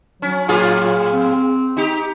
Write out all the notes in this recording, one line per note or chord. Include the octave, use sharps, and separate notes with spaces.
F#3 C#4
A2 F4 G#4
C4
D#4 G4